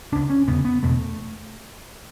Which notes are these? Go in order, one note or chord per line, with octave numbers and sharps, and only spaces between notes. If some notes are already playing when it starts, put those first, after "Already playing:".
C#2 C#3 D4
C#4
E2 C#3 B3
B3
E2 B2 A3